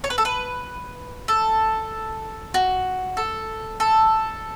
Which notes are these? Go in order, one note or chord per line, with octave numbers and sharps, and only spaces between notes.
C#5
B4
A4
B4
A4
F#4
A4
A4